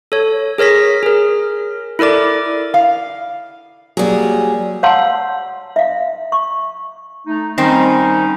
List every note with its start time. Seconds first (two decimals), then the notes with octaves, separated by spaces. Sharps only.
0.12 A4 C#5
0.58 G#4 A#4 C#5 A#6 B6
1.03 G#4 A#4
1.99 E4 A4 A#4 D5 D6
2.74 F5
3.97 F#3 G3 A#3 G#4
4.83 C#5 F5 F#5 A5 C6 E6
5.76 E5 F5
6.32 C#6
7.27 A3 D#4
7.58 D#3 G3 C4 C#4 D#4